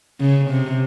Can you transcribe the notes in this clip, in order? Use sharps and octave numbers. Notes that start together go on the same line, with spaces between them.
C#3
C3